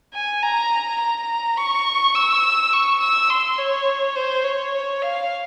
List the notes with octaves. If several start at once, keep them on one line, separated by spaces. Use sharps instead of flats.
G#5
A#5
A#5
C#6
E6
C#6
E6
C6
C#5
C5
C#5
F5